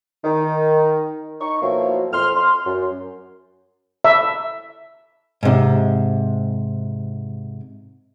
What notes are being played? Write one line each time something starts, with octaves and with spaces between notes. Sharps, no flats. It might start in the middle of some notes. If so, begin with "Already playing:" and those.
D#3
D#4 C#6
B2 F3 F#3 A#3 E4
F2 C6 F6
C6
F#2
E5
G#2 C3